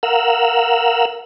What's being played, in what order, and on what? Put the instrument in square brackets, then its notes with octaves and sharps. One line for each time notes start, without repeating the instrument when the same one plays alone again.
[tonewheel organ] A#4 F5 F#5 E6